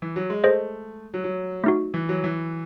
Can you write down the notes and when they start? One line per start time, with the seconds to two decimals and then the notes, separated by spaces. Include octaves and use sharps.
0.02 E3
0.16 F#3
0.30 G#3
0.44 A3 G#4 C5 D#5
1.14 F#3
1.24 F#3
1.64 A3 D#4 F#4
1.94 E3
2.09 F#3
2.24 E3